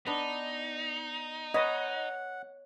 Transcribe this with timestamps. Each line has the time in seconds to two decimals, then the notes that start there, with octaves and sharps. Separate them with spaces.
0.07 B3 D4 D#4
1.54 B4 C#5 D#5 F#5